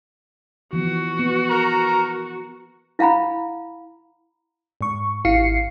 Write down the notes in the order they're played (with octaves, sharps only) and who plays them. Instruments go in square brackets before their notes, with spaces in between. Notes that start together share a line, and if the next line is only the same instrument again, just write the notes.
[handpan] E3 F3 B3 [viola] F#4
[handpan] B3
[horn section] A#4 A#5
[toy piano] E4 F5 F#5 A#5 B5
[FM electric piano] G#2 C#6
G#1 E4 F5 C7 C#7